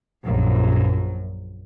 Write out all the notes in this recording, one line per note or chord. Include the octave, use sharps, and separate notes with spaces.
A#1 F#2